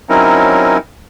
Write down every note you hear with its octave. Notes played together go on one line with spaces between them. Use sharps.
F#3 C4 C#4 D#4 E4 A#4